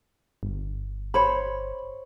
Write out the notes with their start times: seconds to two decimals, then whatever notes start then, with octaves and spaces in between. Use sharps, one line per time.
0.43 G1
1.14 C5 C#5 B5